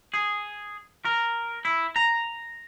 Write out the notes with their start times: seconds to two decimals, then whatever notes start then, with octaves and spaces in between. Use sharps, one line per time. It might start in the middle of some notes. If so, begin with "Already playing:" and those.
0.14 G#4
1.05 A#4
1.65 E4
1.96 A#5